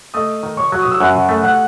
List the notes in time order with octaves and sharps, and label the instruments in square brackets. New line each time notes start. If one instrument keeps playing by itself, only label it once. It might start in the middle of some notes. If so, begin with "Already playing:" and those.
[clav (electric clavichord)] A3 [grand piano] D#5 D#6
[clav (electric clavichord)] D#3
[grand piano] C#5 C#6
[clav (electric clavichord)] F#3
[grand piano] D#6
E6
[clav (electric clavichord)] F#2 [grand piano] F#5 F#6
[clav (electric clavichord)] A3
[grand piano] F#5 F#6